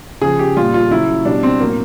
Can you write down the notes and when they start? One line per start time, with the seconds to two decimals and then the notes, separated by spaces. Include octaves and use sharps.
0.21 C#3 F3 G#4
0.39 G4
0.56 A#2 G3 F4
0.74 F4
0.90 C#3 F#3 E4
1.25 B2 G3 D4
1.43 C4
1.60 A2 F#3 A#3